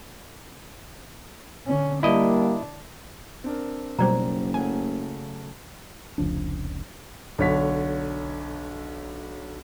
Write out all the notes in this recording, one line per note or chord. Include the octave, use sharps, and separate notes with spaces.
D3 C#4
G3 A#3 D4 E4 D#5
C4 D4 A#4
F#1 B2 F#3 G3 C5 D5 A#5
C#3 F#3 A3 G#5
F1 C#2 F3 D4
B1 D3 C#5 B6